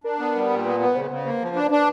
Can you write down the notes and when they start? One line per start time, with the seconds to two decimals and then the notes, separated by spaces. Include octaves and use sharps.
0.04 D4 A#4
0.19 B3
0.35 G3
0.50 A#2
0.65 B3 B4
0.80 B3 B4
0.95 C#3 C5
1.10 C#3
1.25 A#3
1.41 F3
1.56 D4 B4
1.71 D4